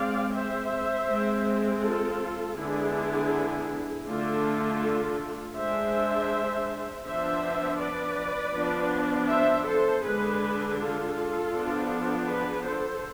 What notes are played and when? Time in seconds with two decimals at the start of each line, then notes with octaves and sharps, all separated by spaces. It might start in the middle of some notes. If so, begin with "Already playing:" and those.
Already playing: G#3 C4 D5 F5
0.33 C5 E5
1.07 G#3 C4
1.82 F4 A4
2.57 D3 G#3 B3 D4 E4 G#4
4.06 D3 A3 D4 F4 A4
5.55 G#3 D4 C5 E5
7.05 F3 B3 D4 C5 E5
7.80 B4 D5
8.54 F3 B3 D4
9.29 C5 E5
9.66 A4 C5
10.03 D3 G#3 D4 G#4 B4
10.78 F4 A4
11.53 F3 B3 D4
12.27 G#4 B4
12.65 A4 C5